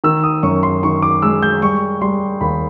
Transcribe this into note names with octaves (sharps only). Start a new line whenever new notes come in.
D#3 E6
D#6
F#2 C#6
C6
D#3 C#6
D6
G#3 E6
G6
G3 C#6
G3 C6
D#2 B5